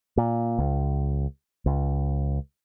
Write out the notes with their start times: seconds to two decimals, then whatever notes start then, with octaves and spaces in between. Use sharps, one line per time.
0.17 A#2
0.59 C#2
1.66 C#2